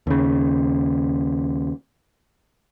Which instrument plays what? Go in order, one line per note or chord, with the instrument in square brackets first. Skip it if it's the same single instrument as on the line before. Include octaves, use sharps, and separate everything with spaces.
[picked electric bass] D#2 C#3